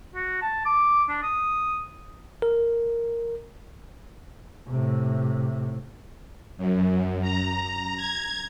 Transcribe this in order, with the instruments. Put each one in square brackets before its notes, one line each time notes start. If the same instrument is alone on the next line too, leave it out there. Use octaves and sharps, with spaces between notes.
[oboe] F#4
A5
D6
D4
D#6
[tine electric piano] A#4
[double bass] A2 C3
[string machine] F#2
A#5
G#6